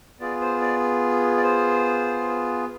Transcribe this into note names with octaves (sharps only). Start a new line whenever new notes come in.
B3 F4 G#4 D5
C5
D5
D5
C5